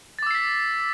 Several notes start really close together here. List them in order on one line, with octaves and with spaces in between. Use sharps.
A6 D6 E6 C7 B6